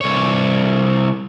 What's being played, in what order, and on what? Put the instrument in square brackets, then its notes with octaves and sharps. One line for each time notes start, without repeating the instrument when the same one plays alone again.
[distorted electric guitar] C2 C#5